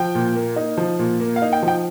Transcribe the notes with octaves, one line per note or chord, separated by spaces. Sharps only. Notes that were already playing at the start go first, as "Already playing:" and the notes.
Already playing: F3 G5
A#2
A#3
D#4
F3
A#2
A#3
F5
D#4
G5
F3
G5